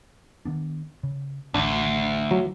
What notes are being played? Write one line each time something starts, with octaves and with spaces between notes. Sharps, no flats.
D#3 B3 D4
C#3
A1 D2 D4
F#3